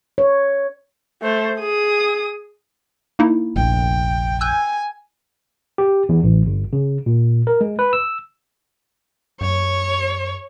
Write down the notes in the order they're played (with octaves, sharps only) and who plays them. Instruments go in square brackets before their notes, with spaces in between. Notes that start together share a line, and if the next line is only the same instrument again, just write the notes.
[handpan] C#5
[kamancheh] A3 C5
G#4 D#6
[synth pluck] A#3 D#4 E4
[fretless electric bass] F1 A#1 [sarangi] G5
[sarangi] G#5 [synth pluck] E6 F#6 G6
[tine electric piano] G4
E2
A1
G1
C#3
A#2
A#4
G#3
B4
E6
[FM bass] F#2 [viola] C#5